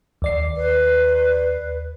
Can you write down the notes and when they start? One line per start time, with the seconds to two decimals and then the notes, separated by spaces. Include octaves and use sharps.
0.22 D#2 D5 C7
0.57 B4